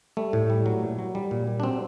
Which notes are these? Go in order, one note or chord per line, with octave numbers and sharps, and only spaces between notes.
G3 A3
A2
G3
F#3
A#2
F#3
G3
A#2
G3
D4
F#3 C4